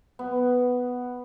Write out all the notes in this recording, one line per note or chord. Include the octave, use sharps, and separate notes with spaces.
B3